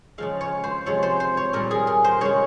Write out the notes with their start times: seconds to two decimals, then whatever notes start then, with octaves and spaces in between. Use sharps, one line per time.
0.18 C#3 F3 G#3 F5
0.41 C#5
0.64 C5
0.86 C3 F3 G#3 C#5
1.03 C5
1.20 C5
1.37 C#5
1.53 A#2 G3 A#4
1.71 G#4
1.87 A#4
2.04 C5
2.21 C#3 G#3 C#5